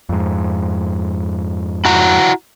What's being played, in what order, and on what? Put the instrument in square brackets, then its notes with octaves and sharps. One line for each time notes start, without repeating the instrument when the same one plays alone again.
[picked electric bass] F2 G#2
[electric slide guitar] E4 F#4 A#5